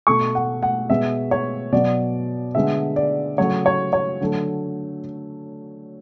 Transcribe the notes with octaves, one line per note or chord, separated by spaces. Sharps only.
B2 A3 C#6
F#5
F#5
B2 G#3 B3 E5
C#5
B2 F#3 B3 D5
D3 G#3 B3 E5
D5
C#3 F#3 A3 C#5
C#5
C#5
D3 F#3 A3